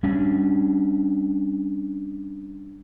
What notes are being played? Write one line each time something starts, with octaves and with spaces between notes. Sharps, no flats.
G3 C#4 D4